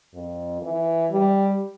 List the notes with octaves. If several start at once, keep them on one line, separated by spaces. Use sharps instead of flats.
F2
E3
G3